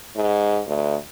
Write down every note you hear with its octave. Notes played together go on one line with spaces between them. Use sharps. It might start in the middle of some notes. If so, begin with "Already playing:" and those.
G#2
D2